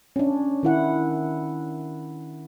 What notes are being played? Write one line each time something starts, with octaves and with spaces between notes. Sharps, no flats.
C#4 D4
D#3 E4 F#5